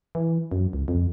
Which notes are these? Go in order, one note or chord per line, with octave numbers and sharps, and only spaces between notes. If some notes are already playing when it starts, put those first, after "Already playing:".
E3
F#2
C#2
F2